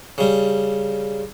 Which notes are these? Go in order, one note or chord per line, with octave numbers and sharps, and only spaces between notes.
C#3 G3